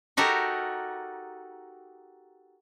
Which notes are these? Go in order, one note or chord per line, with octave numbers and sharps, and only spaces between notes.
D#4 F#4 G4 A4 A#4